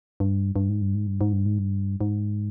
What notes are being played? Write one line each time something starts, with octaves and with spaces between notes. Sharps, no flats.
G2
G2
G#2
G2
G#2
G2
G#2
G2
G#2
G2
G#2